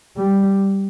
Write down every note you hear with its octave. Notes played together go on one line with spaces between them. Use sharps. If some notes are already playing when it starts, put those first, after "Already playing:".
G3